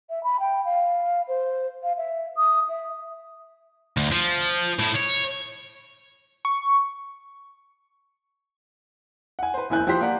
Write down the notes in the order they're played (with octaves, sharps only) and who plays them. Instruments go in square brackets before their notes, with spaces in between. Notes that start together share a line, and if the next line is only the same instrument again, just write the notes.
[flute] E5
B5
G5
F5
C5
F5
E5
D#6
E5
[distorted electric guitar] D2
F3
A2 E4
C#5
[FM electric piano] C#6
[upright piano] F#5 G#5
B4 C5
F#1 E2 E4 G#5 F#6 G6
F3 E4 G4 C5 B6
A#3 D5 F#5